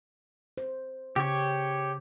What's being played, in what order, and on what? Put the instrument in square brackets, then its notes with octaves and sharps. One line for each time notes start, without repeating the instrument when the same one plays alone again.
[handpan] C5
[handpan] C#3 [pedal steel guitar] G4 C#5